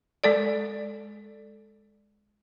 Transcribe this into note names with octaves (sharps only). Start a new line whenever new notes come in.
G#3 A4 D5